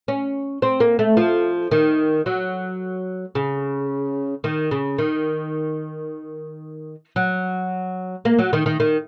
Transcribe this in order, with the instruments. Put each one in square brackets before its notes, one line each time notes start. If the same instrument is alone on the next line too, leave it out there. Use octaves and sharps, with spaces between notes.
[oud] C#4
C4
A#3
A3
F3
D#3
F#3
C#3
D#3
C#3
D#3
F#3
A#3
F#3
D#3
D#3
D#3